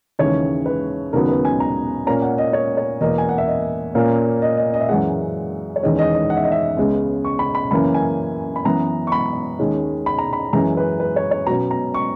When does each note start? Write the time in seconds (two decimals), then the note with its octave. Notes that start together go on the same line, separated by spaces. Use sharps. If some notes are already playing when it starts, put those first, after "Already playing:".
0.19 D#2 C#3 E3 G#3 C#5
0.66 B4
1.13 D#2 C#3 F#3 B3 A#4
1.28 B4
1.45 G#5
1.60 A#5
2.07 A#2 A#3 C#4 A#5
2.22 F#5
2.38 D#5
2.53 C#5
2.77 C#5
3.01 E2 B2 A#3 D#5
3.18 G#5
3.29 F#5
3.38 E5
3.48 D#5
3.95 A#2 A#3 C#4
4.42 D#5
4.57 D#5
4.74 D#5
4.81 E5
4.89 F#2 E3 G#3 F#5
5.76 C#5
5.83 E2 D#3 G#3 C#4 D#5
5.99 D#5
6.14 D#5
6.30 F#5
6.37 E5
6.44 D#5
6.52 E5
6.77 C#2 C#3 G#3 B3
7.25 C#6
7.39 B5
7.55 B5
7.71 F#2 C#3 E3 A#3 B5
7.94 G#5
8.56 B5
8.65 F#2 E3 B3 A#5
9.07 C#6
9.12 B5
9.59 D#2 D#3 G#3 C#4
10.06 B5
10.18 A#5
10.33 B5
10.53 F#2 E3 G#3 A#5
10.77 B4
11.00 B4
11.16 C#5
11.31 C#5
11.47 B2 F#3 C#4 A#5
11.71 A#5
11.94 C#6